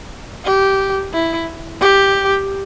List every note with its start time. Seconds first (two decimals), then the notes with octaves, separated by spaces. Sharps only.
0.45 G4
1.13 E4
1.81 G4